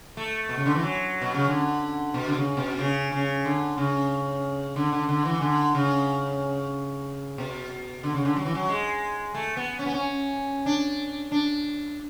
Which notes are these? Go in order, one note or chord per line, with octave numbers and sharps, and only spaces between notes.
A3
B2
C#3
D3
E3
F#3
B2
C#3
D3
B2
D3
C#3
B2
C#3
C#3
D3
C#3
D3
D3
D3
E3
D3
C#3
B2
D3
C#3
D3
F#3
E3
F#3
G#3
A3
B3
C#4
B3
C#4
D4
D4